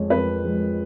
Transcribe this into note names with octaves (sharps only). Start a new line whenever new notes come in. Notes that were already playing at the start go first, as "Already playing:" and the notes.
Already playing: F2 F3 G#3 C#5
F2 B4
F3 G#3